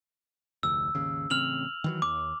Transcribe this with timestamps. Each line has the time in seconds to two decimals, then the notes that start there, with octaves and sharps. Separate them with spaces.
0.63 F1 D2 E6
0.95 G#1 D#2 C#3
1.30 A1 C#3 C4 F6 F7 F#7
1.84 D#3 E3 F#3
2.02 D#2 D6